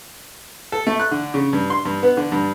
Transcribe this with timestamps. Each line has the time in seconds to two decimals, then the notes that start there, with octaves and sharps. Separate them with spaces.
0.72 A4
0.87 A3
1.00 F#6
1.11 D3
1.34 C#3
1.53 G2
1.70 C6
1.85 G2
2.03 B3
2.17 D3
2.32 G2